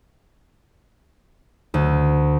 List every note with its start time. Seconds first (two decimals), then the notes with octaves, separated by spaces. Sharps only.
1.74 D2